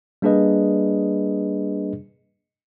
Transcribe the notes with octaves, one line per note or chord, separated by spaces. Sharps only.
G3 A#3 D4 G#4 B4 D#5